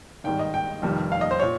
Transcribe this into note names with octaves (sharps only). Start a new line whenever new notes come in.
G#1 G#2 D#3 G3 G5
D#5
G5
F1 F2 D#3 G3
F5
D#5
C5
A#2 C#5